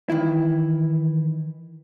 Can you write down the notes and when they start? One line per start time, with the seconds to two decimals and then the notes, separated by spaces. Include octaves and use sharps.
0.10 D#3 E3 E4